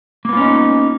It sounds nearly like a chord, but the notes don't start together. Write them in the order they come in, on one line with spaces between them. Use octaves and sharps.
A#3 B3 F4 C#4 D#4